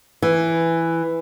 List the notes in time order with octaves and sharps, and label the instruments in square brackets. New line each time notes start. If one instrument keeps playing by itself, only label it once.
[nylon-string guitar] E3